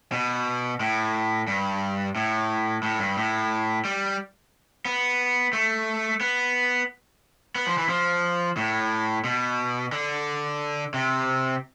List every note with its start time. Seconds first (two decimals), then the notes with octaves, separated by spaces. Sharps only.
0.12 B2
0.80 A2
1.48 G2
2.16 A2
2.83 A2
3.00 G2
3.17 A2
3.85 G3
4.85 B3
5.53 A3
6.21 B3
7.55 B3
7.67 F3
7.78 E3
7.89 F3
8.57 A2
9.24 B2
9.92 D3
10.94 C3